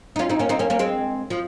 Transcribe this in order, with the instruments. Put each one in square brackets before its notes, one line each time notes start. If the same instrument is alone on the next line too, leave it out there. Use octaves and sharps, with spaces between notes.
[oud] D#4
C#4 F4
C4 D#4
A#3 C#4
C4 D#4
A#3 C#4
A#3 C#4
G#3 C4
F3